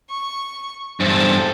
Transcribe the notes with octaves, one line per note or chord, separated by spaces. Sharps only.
C#6
E2 G2 A4 C5